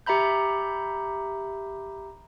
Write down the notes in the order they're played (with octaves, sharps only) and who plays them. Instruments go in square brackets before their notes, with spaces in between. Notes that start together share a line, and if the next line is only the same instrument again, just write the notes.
[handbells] G4 E5 A#5 B5 G6